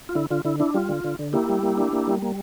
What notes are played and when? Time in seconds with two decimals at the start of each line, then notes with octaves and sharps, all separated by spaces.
0.09 F4
0.15 D3 E4
0.30 D3 F4
0.45 D3 E4
0.60 D4 E4
0.74 G3 F4
0.89 D3
1.04 D3
1.19 D3
1.33 A#3 E4 G4
1.49 G3
1.63 A#3
1.78 D4
1.93 A#3
2.07 G3
2.22 A#3